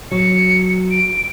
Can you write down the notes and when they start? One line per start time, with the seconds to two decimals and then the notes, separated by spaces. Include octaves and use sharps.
0.11 F#3 C#7
0.91 D7